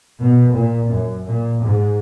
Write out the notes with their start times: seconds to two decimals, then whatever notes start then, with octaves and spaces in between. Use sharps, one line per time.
0.20 B2
0.55 A#2
0.91 F#2
1.26 A#2
1.62 G#2